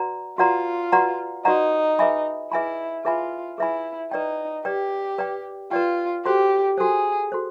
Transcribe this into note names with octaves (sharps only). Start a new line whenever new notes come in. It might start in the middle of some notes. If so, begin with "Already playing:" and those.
Already playing: F#4 B4 D5 F#5 A#5
F4 F#4 B4 D5 F#5 A#5
F#4 B4 D5 F#5 A#5
D#4 F#4 B4 D5 F#5 A#5
G#4 B4 E5 G#5 B5
E4 G#4 B4 E5 G#5 B5
F4 G#4 B4 E5 G#5 B5
E4 G#4 B4 E5 G#5 B5
D#4 B4 D5 G5
G4 B4 D5 G5
B4 D5 G5
F4 B4 D5 G5
F#4 G4 A4 C5
F#4 G#4 A4 C5
F#4 A4 C5